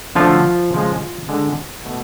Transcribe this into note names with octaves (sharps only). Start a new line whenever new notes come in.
D3 F3 F#3 A3 F4
C#3 F3 G#3
D3 G#3
B2 A3